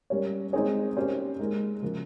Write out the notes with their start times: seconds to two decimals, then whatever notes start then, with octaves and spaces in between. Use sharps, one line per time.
0.10 G3 C#4 G4 A#4 C#5
0.53 G#3 C4 D#4 G#4 C#5
0.97 A#3 C#4 G4 C5
1.39 G#3 D#4 A#4
1.82 C#3 F3 A#3 F4